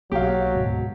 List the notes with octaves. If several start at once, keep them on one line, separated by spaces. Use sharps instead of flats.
B1 F#3 A#3 F#4 G4 F5
D2 G#2 B2